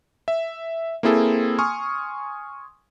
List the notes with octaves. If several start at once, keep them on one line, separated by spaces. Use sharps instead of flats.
E5
A#3 C4 E4 G#4 A4
G#5 C6 C#6 D#6 F6